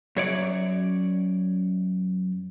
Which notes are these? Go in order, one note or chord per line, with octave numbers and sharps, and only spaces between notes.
F#2 C#5 D5